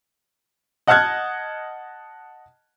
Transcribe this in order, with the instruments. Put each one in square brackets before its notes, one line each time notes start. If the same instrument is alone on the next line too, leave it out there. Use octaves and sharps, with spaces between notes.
[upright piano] D#5 F#5 A5 F6 F#6 G#6